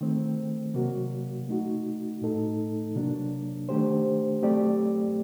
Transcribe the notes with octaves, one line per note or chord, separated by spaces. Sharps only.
D#3 A3 C4
C3 F#3 A#3 F#4
A3 D#4 F#4
A2 A3 D#4 A4
C3 F#3 A#3 D4
D#3 A3 D4 G4 C5
F#3 A3 C4 G4 D5